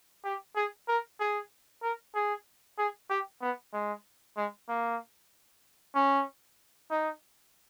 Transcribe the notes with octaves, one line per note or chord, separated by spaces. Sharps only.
G4
G#4
A#4
G#4
A#4
G#4
G#4
G4
B3
G#3
G#3
A#3
C#4
D#4